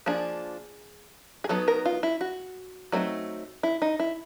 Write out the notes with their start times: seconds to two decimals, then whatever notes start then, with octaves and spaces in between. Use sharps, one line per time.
0.06 F3 A#3 D4 G#4
1.44 G#4
1.49 F#3 B3 D#4 A4
1.68 A#4
1.86 F4
2.03 E4
2.21 F#4
2.92 F#3 A3 C4 D#4
3.63 E4
3.82 D#4
3.99 E4